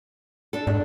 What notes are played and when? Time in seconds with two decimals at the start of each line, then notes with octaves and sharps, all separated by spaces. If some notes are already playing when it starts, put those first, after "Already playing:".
0.53 D4 A4
0.67 G#2 D4